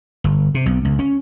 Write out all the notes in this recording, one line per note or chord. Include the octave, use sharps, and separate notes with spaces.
G1
C3
B1
C#2
C#4